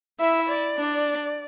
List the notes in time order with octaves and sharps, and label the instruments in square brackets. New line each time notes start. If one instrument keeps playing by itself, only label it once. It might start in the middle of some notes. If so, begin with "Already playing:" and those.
[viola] E4 [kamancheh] E5
[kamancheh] D5
[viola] D4